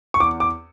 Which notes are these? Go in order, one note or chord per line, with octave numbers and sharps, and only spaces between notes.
C#6
E2 D6
D6